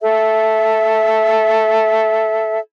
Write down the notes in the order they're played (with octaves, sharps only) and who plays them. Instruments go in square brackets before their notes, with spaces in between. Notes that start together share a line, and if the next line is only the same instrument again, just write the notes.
[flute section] A4 E5